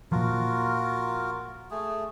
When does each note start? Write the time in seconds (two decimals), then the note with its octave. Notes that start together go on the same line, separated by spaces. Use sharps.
0.12 A#2 F3 F4 F#4 A#4
1.71 A3 G#4